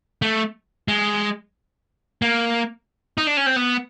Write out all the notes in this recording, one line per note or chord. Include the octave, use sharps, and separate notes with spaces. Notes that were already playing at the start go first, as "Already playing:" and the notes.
A3
G#3
A#3
D#4
D4
C#4
C4
B3